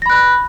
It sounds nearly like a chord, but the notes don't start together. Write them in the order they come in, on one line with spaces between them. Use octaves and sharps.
A#6 B5 F#6